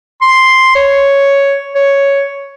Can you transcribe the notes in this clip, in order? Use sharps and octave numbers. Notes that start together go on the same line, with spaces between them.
C6
C#5
C#5